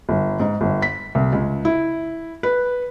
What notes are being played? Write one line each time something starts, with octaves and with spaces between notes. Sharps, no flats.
G1
G#2
G1
B6
C2
C#2
E4
B4